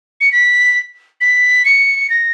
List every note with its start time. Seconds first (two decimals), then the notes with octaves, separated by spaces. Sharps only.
0.21 C#7
0.32 B6
1.21 B6
1.65 C#7
2.10 A#6